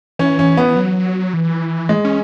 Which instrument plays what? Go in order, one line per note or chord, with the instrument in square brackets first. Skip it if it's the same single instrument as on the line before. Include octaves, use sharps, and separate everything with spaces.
[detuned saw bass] E3 [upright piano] C#4
[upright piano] C#4
B3
[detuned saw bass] F#3
E3
[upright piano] G#3
[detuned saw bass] C#4